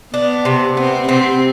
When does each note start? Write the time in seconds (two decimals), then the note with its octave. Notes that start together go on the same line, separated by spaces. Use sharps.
0.14 B3 D4
0.45 C3
0.77 B3 C4
1.09 C3 C4